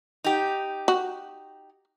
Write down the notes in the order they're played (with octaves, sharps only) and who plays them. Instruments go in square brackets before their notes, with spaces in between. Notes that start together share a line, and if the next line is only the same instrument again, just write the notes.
[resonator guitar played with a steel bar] D#4 G4
[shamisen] F#4